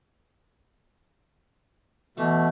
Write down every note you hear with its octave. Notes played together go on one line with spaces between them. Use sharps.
B2 E3 A3